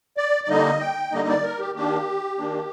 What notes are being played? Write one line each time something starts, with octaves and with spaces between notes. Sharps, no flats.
D5
D5
D3 G3 A#3 D#4 D#5
G5
D3 G3 A#3 D#4 D#5
D5
A#4
G4
D#3 A#3 D4 G4
D#3 A#3 D4